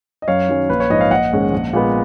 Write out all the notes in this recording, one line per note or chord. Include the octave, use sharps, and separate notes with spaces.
D#5
F#2 C#5 F5
D#3 F#3 C#4
A#1 B4
C#5
G#2 F3 D#5
F5
A#1 D#5 F#5
G#2 D#3 G#3 C#4
A#1
A#2 G#3 B3